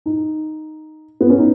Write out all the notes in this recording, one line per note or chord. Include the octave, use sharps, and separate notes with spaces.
D#4
B3
C#4
D#4